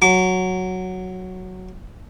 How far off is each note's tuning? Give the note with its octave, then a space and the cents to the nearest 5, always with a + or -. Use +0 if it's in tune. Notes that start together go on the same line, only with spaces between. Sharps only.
F#3 +0 D6 -35